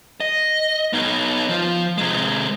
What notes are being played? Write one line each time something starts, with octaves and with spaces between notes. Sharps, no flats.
D#5
B3 D#4
F3
C3 G#3